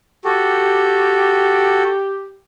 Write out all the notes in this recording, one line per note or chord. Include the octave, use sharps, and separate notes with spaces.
F#4 G4 A4